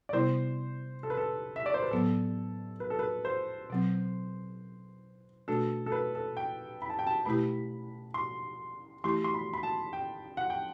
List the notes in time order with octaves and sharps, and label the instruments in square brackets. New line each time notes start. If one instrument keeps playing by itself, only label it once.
[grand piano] D5
[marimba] C3 G3 B3 E4 [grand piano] C5
[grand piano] A4
B4
A4
E5
D5
C5
B4
[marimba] A2 F#3 B3 [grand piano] A4
[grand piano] B4
A4
B4
C5
[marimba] B2 F#3 C4
[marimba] B2 A3 D4 F#4 [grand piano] A4
[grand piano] A4
B4
A4
G5
B5
A5
G5
A5
[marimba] B2 A3 E4 G4 [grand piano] B5
[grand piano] C6
[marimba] E3 A3 E4 G4 [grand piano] C6
[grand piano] C6
B5
B5
A5
G5
F#5
G5